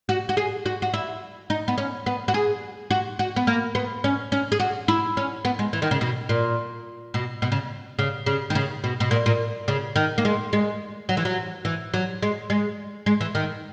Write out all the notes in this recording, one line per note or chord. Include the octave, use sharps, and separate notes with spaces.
F#4
F#4
G#4
F#4
F#4
E4
D#4
B3
C#4
B3
F#4
G#4
F#4
F#4
B3
A#3
B3
C#4
C#4
G#4
F#4
E4
C#4
B3
G#3
E3
D#3
C#3
B2
A#2
B2
B2
C#3
C#3
C#3
D#3
C#3
B2
B2
A#2
A#2
C#3
D#3
A#3
G#3
G#3
F#3
E3
F#3
E3
F#3
G#3
G#3
G#3
E3
D#3